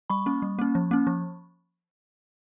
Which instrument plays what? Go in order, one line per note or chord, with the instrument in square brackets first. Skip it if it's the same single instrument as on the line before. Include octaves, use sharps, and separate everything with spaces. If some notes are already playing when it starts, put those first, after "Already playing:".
[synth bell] G3 B5 C#6
A#3 C#4
G3
A#3 C#4
F3
A#3 C#4
F3